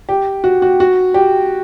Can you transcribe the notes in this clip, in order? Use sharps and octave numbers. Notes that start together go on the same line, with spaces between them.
G4
F#4
F#4
F#4
G4